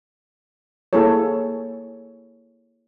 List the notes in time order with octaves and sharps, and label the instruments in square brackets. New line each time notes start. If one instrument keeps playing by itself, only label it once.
[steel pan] A#3 E4 G#4 A4 C#5